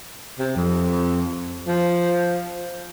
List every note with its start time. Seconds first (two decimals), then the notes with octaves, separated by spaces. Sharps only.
0.39 C3
0.56 F2
1.68 F3